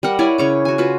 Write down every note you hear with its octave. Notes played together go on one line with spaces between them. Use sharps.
G3 A#4 F#5
E4 C#5 D5 G#5
C#3 C#5 D6
F#4 G#5
F4 F#4 B4